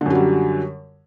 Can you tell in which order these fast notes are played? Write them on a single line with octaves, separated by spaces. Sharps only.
D3 F#2 F#3 G3